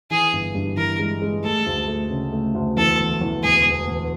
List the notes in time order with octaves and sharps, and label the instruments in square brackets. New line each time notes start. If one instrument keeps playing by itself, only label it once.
[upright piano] E3 [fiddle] G#4
[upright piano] G1
G2
[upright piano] E3 [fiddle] A#4
[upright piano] G#3
G#3
[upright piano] A3 [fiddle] A4
[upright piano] D2
A3
C#3
A3
D2
[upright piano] E2 [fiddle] A4
[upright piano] E1
E2
[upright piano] E1 [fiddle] G#4
[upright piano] E1
E1